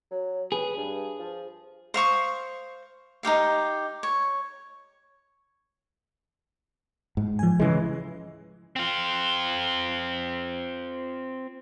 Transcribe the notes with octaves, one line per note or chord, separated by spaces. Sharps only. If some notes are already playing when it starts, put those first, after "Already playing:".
F#3
G#4 B4
G2
F3
C5 F5 C#6 D#6
D#4 E4 G4 F5
C#5
G#2
F3 G#5
C#3 E3 G#3
C4 F4